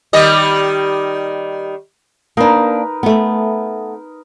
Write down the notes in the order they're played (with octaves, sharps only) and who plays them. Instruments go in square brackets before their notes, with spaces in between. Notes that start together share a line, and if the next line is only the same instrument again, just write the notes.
[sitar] D#3 G3 D#5
[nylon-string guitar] A#3 D4 [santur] D#4 A#4 B4
[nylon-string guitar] A3 B3